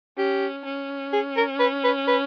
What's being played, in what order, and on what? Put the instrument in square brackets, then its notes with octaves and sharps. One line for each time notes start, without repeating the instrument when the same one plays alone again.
[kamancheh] C#4 [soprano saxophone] G4
[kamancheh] C#4
[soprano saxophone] G#4
A#4
B4
B4
B4